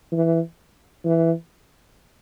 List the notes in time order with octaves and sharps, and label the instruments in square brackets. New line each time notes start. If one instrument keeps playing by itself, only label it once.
[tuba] E3
E3